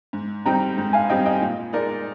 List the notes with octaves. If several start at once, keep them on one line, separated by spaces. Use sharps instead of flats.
G#2
G3 C4 D#4 G5 A#5
G#2
F5 G#5
G3 C4 D#4 D#5 G5
D#5 G5
A#2
G#3 D#4 A#4 D5